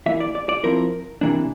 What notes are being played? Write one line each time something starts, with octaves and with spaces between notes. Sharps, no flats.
E3 A#3 E4 E5
D5
D5
D5
F3 C4 E4 A#4
C3 E3 A#3 D4